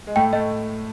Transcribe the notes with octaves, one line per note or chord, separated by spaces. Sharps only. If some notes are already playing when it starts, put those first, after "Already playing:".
G#3
A2 A3 G5
A2 A3 D#5